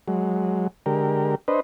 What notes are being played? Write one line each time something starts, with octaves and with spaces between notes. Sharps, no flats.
F#3 G#3
D3 G#3 G4 A#4
D4 B4 C5 D#5